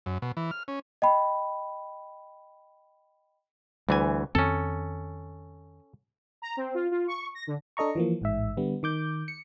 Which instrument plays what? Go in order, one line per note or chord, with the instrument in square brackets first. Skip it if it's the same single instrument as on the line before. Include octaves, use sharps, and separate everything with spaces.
[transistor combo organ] F#2
B2
E3
F6
C#4
[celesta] D#5 G5 B5
[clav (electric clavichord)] D2 E3 G#5 [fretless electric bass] G3
[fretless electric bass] F2 D#3 C4 [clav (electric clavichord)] C#4 A4
[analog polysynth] A#5
C4
F4
F4
C#6
A#6
D3
[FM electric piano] D4 A4 D#5 A#5 C#6
E3 F3 A#3
A1 G#2 E5
D3 G3 B3
D#3 D6 G6
C#7